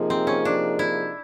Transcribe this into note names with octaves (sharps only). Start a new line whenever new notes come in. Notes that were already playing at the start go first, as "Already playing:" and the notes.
Already playing: C3 F3 A#3 D#4 G#4
C4
C#4
D4
E4